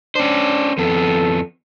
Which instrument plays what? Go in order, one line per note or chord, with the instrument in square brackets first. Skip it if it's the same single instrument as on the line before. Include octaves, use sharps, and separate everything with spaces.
[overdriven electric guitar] C#4 C5 [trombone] D4
[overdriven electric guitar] F2 B3 [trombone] A4